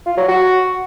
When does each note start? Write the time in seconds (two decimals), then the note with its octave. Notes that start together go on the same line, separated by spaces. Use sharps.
0.06 F4
0.17 F#3
0.28 F#4